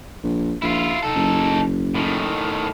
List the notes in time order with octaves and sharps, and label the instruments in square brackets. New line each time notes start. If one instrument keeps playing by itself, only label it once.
[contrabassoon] A#1
[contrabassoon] A#1 [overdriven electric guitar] E4 F4
[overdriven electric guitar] D#4 A4
[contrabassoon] F#1
[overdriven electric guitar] A2 D#3